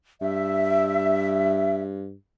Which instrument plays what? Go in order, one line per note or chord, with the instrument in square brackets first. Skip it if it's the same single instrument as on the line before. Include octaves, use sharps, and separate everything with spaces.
[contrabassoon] G2 [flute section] E5